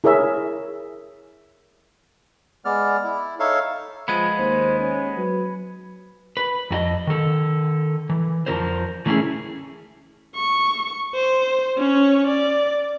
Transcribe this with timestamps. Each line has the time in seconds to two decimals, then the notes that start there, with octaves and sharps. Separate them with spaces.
0.04 E4 G#4 A#4 C#5 E5
2.65 G#3 B3 D5 F6
3.04 E4
3.39 D#4 A4 C#5 E5 F5
4.08 F3 G#3 B3 B5 G#6 D#7
4.39 D#2 C5
4.79 C#4
5.17 F#3 B4
6.37 B4
6.71 F2 F#4 D#5
7.07 D#3 A4
8.10 E3
8.47 F2 F3 F#3 E4 A#4 C5
9.06 E3 A3 C#4 E4 G#4
10.35 C#6
11.14 C5
11.77 C#4 C#5
12.27 D5